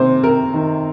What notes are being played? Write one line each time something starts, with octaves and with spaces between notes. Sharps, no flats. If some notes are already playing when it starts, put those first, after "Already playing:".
Already playing: C3 D#3 C5
C3 A#4
D#3